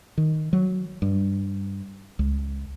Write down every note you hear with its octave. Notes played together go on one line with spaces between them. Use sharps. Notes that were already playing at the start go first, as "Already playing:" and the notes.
D#3
F#3
G2
C#2